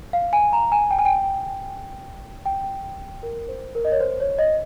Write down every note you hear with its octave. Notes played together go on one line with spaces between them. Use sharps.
F5
G#5
A#5
G#5
G5
G#5
G5
G5
A#4
C5
A#4
D#5
C#5
C5
C#5
D#5